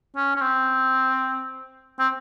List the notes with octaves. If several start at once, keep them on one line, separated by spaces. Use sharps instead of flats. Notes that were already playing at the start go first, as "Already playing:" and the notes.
C#4
C#4
C4
C4